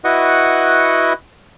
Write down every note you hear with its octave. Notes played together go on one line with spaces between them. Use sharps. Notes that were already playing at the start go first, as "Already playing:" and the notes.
E4 F#4 B4 D#5 F#5 C#6